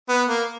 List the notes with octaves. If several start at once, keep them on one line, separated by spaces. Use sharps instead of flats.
B3
A#3